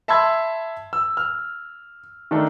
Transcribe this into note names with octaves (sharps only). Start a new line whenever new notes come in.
E5 A5 B5 C6 E6 G#6
E6
F6
D#3 A3 D4 A4